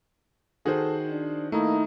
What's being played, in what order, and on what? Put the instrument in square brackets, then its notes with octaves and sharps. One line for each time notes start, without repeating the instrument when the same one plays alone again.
[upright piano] D#3 F#4 [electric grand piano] G#4 C5 [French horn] A4
[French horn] D4
[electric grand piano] A3 E4 [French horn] A#3 [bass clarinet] D#4